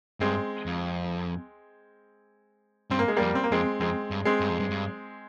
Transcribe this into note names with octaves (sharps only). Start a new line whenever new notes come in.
G2 G#3 C4
F2
G2 C4
A#3
G#3
F2 G3 A#3
C4
A#3
F2 G#3 C4
F2 G#3 C4
G2
G#3 C4
G2
F2
G2
G2